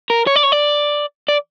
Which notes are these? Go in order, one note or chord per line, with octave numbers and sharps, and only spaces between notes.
A#4
C#5
D5
C#5
D5
D5